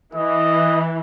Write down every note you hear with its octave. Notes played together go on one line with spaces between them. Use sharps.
E3 D#5